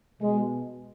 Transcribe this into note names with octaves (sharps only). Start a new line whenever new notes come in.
B2 G#3